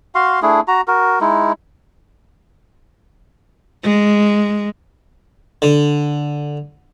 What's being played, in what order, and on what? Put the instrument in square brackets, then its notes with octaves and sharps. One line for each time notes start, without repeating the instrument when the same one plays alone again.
[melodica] F#4 F5 C6
A3 D4 E4 G#4
F#4 A#5
F#4 A#4
G#3 D#4 E4
[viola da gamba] G#3
[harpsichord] D3